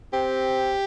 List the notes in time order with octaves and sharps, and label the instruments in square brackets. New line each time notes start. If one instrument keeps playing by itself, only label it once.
[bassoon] C4 [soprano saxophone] G4